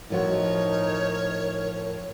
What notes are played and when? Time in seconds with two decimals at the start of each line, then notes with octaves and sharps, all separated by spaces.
0.10 A2 F3 D#4 F#4 A#4 C#5